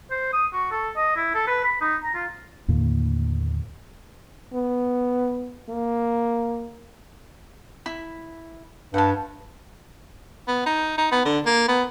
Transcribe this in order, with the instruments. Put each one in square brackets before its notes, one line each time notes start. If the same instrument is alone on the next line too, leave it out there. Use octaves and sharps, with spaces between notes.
[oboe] C5
D#6
F#4
A4
D#5
E4
A4
B4
B5
D#4
A#5
F4
[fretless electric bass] D#2 A2 D3 A#3
[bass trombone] B3
A#3
[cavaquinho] E4 B5
[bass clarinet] G2 [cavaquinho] F#5 A5
[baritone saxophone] B3
D#4
D#4
B3
D3
A#3
B3